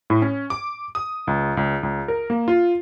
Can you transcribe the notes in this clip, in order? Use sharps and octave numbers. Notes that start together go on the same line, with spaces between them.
A2
C#4
D6
D#6
C#2
C#2
C#2
A#4
A#3
F4